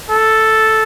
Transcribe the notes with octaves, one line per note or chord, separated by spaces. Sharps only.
A4